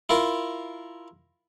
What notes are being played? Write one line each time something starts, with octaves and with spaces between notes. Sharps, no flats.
E4 F4 A#4